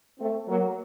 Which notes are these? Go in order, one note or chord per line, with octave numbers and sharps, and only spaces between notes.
A3 C4
F#3 A#3